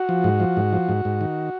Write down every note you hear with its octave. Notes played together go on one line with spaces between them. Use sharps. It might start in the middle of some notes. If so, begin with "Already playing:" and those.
Already playing: F#4
F3
G#2
F3
G#2
F3
G#2
G#2
D#3